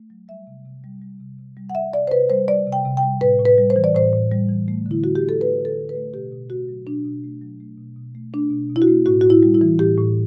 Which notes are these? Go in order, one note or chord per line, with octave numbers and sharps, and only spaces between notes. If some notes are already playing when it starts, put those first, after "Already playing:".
Already playing: A3
F#3
G3 E5
C3
C3
G3
G3
C3
C3
G3
F#5
G3 E5
C3 D5
C5
C3 B4
G3 C5
G3 D5
C3
G5
C3
G5
G3
A2 B4
A2
B4
G3
C5
E3
D5
A2 C5
A2
G3
E3
A3
D3
E4
D3 F#4
G4
A3
A4
A3 B4
D3
A4
D3
B4
A3
B2 G4
B2
A3 F#4
F#3
B2 D4
B2
A3
F#3
A3
B2
B2
A3
A3 D4
B2
B2
E4
F#4
A3
A2 F#4
A2 F#4
E4
G3
E4
E3
A2 G4
A2